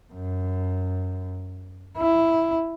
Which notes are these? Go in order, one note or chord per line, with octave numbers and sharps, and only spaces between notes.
F#2
E4